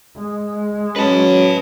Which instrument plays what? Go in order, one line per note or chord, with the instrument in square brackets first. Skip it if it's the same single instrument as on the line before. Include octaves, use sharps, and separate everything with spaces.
[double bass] G#3
[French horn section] F#3 C#4 [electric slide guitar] B4 A5